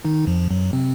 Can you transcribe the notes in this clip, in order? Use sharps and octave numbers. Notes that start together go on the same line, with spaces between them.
D#3 D#4
F2 F3
F#2 F#3
C3 C4